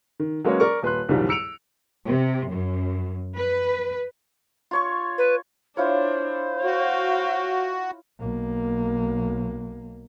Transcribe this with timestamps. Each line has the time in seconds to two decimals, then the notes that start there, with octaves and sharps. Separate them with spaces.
0.20 D#3
0.44 F#3 G#3 A#3 C#4 B4 C#5
0.60 A#4 D5 C#6
0.83 D#1 B4 C6 F#6
1.08 C2 F#2 A#2 D#3 F3 G3
1.29 E6 C#7 D7 F7
2.05 C3
2.48 F#2
3.36 B4
4.71 F4 C#5 C#6
5.18 B4
5.77 D4 E4 F4 C5 C#5
6.64 F#4 F5 G5
8.19 B1 A#3